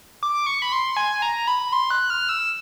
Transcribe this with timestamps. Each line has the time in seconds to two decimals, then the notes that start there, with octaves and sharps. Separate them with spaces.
0.23 D6
0.46 C#6
0.62 B5
0.72 C6
0.97 G#5
1.22 A#5
1.48 B5
1.73 C6
1.91 F#6
2.10 F6
2.29 E6